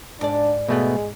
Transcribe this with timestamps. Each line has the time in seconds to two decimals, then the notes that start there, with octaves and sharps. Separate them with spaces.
0.21 G#2 D4 D5
0.69 B2 G#3 A3 B3